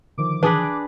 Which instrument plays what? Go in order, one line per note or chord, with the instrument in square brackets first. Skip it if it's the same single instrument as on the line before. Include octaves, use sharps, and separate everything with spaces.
[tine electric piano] D3 D#3 F3 [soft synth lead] D6
[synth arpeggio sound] E3 G#5 D#6 [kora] D4 G#4 B4